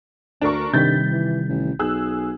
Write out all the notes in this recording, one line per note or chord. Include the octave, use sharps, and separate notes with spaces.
D2 D4 A#4 C#6
G2 C3 D#3 G3 G6 A6 B6
E3
A1
B1 G#4 E6 F#6